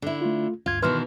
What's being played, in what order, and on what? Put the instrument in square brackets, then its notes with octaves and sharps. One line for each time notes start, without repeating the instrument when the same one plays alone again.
[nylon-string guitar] D3 E4
[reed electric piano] A3 F4
[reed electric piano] D2 G2 G#6 [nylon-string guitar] F4
[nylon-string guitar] B2 D#3 E3 [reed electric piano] B4 C6 F6